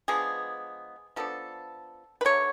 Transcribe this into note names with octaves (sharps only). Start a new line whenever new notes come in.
F3 G#3 B3 D4 G#4
F3 B3 D4 A4
B4
D3 F#3 A3 C#5